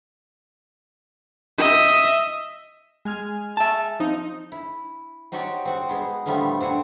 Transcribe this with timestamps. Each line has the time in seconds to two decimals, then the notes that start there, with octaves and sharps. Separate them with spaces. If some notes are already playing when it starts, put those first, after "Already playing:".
1.58 D#5 E5
3.05 G#3 G#5 F6
3.57 E5 A5
4.00 F3 C4 D#4
4.52 E4
5.32 C4 D#4 F#4 G4 C#5 D5
5.65 C4 F#4
5.89 G#3 B3
6.26 A2 D3 F3 G3 A3 B3
6.60 C4 D4 F#5 G#5